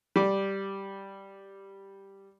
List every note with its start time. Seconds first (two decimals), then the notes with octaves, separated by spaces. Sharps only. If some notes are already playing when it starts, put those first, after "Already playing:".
0.16 G3 D6